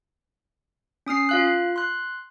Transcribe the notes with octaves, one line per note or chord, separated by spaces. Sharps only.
C#4 D#6 F6 C7
F4 F5 F#6
C6 F#6